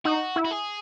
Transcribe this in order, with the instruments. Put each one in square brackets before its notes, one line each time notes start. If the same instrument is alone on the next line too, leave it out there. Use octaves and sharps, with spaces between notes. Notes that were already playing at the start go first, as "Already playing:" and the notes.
[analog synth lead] D#4 [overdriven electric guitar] F#4
[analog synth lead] E4
[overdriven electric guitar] F#4
G#4